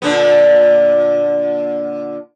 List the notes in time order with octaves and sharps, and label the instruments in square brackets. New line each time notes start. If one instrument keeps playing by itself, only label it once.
[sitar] A#2 D3 B3